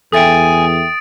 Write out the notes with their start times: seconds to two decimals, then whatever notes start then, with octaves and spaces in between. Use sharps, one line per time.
0.12 E2 A4 E5 G5 G#5 D#6 A6 D7